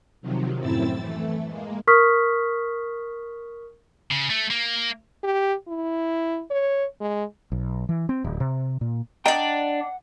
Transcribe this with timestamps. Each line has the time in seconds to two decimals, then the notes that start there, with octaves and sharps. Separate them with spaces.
0.22 C3 D#3 F3 F#3
0.60 F#2 A2 C4 E4 E6 A6
0.99 E3 A3
1.48 G#3 A#3
1.87 A#4 C#6 D#6 F6 B6
4.11 C#3
4.30 A3
4.50 A#3
5.23 G4
5.68 E4
6.51 C#5
7.01 G#3
7.52 B1
7.89 E3
8.09 C4
8.24 D1
8.40 C3
8.81 A#2
9.26 D4 D5 D#5 F#5 G5 A#5